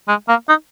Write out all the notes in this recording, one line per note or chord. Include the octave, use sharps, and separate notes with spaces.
G#3
A#3
D#4